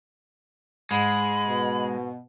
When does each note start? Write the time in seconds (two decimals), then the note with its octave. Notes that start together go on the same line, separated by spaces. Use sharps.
0.91 G#2 G#3 B5
1.46 B2